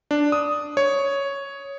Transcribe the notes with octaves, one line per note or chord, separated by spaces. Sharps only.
D4
D#6
C#5